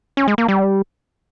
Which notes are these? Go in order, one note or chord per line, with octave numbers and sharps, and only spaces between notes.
C#4
G#3
A#3
G3